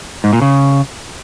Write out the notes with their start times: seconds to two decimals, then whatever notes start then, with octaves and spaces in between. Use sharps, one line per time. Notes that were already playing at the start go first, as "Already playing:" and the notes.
0.24 G#2
0.33 A#2
0.42 C#3